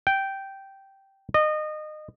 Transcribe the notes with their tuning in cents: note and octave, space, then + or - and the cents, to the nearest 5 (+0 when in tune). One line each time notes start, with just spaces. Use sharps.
G5 -10
D#5 -25